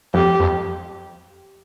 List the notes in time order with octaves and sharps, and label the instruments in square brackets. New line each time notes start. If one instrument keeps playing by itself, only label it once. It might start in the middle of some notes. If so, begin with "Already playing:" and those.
[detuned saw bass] F2 [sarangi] G4
[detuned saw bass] F2